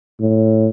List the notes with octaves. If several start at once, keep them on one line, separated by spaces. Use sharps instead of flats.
A2